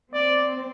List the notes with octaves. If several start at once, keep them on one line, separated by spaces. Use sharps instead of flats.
C4 D5